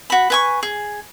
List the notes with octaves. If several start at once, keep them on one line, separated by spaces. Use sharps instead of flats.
F#4 B5
B4 G#5 C#6
G#4